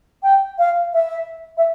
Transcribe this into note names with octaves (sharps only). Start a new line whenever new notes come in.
G5
F5
E5
E5